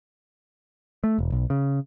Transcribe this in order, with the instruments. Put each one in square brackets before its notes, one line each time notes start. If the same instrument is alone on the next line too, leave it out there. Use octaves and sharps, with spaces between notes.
[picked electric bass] A3
E1
B1
C#3